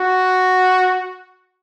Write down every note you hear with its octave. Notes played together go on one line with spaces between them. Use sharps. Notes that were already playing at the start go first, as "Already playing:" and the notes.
Already playing: F#4